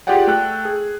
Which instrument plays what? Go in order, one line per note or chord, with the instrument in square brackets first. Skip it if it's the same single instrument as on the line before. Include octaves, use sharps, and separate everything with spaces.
[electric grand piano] F4 G4 G#4 D5 F#5 G5
A3 A4 G5 F#6
G#4